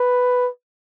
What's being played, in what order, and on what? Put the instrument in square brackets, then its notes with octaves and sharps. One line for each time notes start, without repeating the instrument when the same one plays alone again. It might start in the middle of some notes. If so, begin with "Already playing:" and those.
Already playing: [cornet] B4